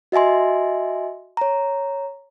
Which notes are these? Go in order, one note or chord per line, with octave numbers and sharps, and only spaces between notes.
F#4 D#5 E5 G#5 C6
C#5 A#5